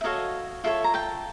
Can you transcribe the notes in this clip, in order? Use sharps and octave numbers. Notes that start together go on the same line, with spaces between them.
E5
D#4 F#4 A4 C#5 D#5 F5
F4 A4 C#5 E5
A#5
G5 A5